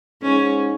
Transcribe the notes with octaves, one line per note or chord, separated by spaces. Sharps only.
G#2 C#4